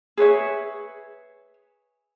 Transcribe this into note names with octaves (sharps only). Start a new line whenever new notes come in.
G#4 B4 C#5 E5